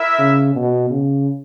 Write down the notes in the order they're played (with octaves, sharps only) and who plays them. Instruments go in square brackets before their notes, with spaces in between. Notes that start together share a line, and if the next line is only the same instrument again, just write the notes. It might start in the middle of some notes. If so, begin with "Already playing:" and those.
Already playing: [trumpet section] E4 A#4 E5
[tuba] C#3
B2
C#3